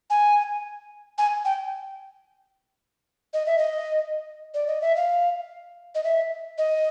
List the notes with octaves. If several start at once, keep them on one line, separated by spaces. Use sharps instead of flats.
G#5
G#5
G5
D#5
E5
D#5
D5
D#5
E5
F5
D#5
E5
D#5